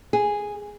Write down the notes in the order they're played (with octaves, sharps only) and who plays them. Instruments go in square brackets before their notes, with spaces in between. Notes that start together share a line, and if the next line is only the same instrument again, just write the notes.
[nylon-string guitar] G#4